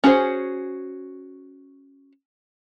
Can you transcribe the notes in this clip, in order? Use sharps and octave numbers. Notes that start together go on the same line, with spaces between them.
C#4 F#4 G#4 A#4 C5